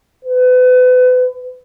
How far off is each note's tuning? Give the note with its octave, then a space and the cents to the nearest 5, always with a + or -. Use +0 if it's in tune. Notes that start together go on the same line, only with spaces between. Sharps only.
B4 +35